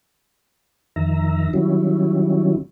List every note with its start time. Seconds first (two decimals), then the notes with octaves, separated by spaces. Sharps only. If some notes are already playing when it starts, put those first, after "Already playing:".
0.96 F2 D#3 E5 A#5
1.54 D#3 F#3 G3 C#4 E4